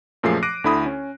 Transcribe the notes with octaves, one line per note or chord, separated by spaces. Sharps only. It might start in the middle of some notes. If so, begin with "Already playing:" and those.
F#2 A#2 F3 A3 G#4 C7
D6 F#6 A#6 D7 D#7
D2 D3 E4 B5 D#6
C#4